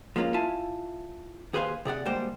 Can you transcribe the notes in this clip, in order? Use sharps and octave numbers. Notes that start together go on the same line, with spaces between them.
F3 G#3 A#3 C#4 F4
E4 F4 E5 G#5 A5
D#2 G#4 B4 C5 F5 G#5
C3 G#4 D5 F#5
D2 G3 G#3 A#3 C5 G5